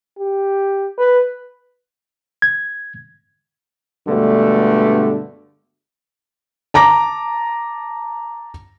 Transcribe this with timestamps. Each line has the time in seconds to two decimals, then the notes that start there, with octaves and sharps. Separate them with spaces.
0.19 G4
0.98 B4
2.42 G#6
4.08 G2 B2 D3 G#3 A3
6.74 A5 A#5 D6 A#6